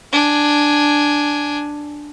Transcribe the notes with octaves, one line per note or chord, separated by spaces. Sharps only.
D4 G#5